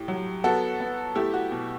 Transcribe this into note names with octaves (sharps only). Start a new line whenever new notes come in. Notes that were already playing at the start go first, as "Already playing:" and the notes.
Already playing: A2 G4
F#3
B3 F#4 A4
B3
A3 E4 G4
F#4
B2